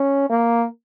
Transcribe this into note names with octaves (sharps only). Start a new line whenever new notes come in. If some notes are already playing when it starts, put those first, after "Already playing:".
Already playing: C#4
A#3